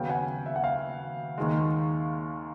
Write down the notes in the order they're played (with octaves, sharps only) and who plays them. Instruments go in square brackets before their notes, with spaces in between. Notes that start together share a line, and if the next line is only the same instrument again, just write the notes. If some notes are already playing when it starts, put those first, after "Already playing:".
Already playing: [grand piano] D#2 C#3 F#3 B3 F5 G5
F#5 G#5
E5
F#5
F5
D#2 D#3 G#3